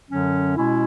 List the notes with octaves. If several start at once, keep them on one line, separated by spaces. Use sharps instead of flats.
F#2 D3 F#3 C#4
B2 G#3 C#4 E4